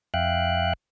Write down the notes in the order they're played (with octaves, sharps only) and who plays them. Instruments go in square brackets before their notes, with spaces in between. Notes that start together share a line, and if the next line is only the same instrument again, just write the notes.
[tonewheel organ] F2 E5 F5 G5 F#6